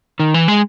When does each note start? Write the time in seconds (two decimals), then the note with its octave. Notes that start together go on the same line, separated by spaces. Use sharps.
0.20 D#3
0.34 E3
0.48 G#3